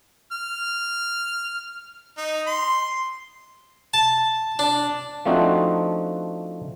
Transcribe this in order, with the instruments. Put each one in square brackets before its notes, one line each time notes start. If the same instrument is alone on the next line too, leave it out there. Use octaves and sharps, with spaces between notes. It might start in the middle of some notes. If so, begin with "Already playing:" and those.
[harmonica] F6
D#4
C6
[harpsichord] A5
D4
[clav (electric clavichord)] F3 A3 C4 D4 D#4 F#4